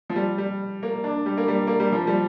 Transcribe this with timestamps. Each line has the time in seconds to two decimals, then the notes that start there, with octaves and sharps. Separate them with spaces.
0.10 F3
0.16 G3
0.38 G3
0.83 A#3
1.04 D4
1.26 G3
1.37 A#3
1.48 G3
1.67 A#3
1.80 G3
1.92 F3
2.07 G3